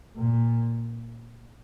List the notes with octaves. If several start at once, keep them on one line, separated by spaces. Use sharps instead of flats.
A#2